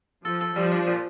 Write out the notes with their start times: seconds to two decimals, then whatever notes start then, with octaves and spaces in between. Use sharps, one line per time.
0.25 F3 A4
0.41 A4
0.56 F3 G3
0.72 D4
0.87 A#2